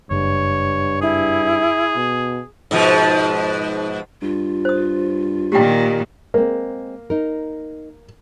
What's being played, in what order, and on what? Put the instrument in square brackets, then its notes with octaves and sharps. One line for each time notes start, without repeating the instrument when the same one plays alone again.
[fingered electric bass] F#1 [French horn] G2 [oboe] C#5
[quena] E4 [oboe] G#4
[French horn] B2
[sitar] G#2 B2 F3
[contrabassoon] G2 [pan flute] F4
[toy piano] C5 D#6
[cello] A#2 D#3 [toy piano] G4 G5
[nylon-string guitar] G#3 C4 [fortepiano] A#3
[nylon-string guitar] D#4 A#4